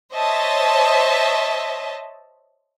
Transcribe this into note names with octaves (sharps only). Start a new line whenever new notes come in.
C5 C#5 D#5 E5 A5